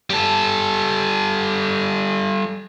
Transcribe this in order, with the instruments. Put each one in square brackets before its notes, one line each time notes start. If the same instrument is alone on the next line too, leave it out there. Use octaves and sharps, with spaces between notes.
[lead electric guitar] G3 A4